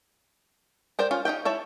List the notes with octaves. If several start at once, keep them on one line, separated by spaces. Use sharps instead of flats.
A#4 C5 D5 G5
C#4 F4
D#4 E4 G4 G5
E4 C#5 A5